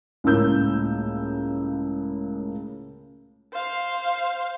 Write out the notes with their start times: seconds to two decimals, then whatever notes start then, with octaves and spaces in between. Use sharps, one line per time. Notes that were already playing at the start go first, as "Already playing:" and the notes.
0.24 C#2 A2 C#3 A#3 E6 G6
3.52 C5 F5